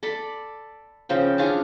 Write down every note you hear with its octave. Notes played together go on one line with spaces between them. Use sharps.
A4 D5 B5
C#3 F3 G5
C#4 D4 F4 G#4